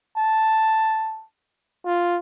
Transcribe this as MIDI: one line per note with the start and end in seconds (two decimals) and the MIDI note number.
0.17 1.25 81
1.85 2.19 65